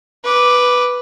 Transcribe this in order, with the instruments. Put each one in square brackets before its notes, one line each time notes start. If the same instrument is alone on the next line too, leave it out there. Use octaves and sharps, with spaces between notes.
[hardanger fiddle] B4 D6